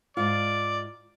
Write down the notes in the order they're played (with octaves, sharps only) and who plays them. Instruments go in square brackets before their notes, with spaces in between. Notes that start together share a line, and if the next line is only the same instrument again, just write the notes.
[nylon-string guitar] G#2 F4 [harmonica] D5